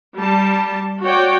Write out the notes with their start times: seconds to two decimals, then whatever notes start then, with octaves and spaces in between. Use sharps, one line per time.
0.16 G3 A5
1.02 F#4 C#5 D5 G5